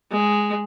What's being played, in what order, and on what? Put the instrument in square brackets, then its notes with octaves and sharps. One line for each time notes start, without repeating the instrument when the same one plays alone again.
[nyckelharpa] G#3